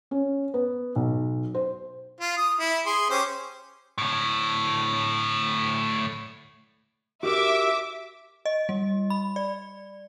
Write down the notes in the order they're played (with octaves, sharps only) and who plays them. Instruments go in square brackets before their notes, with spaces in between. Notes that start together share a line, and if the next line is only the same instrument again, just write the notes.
[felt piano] C#4
B3
B1
C5
[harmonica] F4
D#6
E4
G#4 C6
C#4 G4 C5
[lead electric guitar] D2 A2
[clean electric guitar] F#4 G4 A#4 [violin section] E5 D6
[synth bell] D#5
G3
B5
D5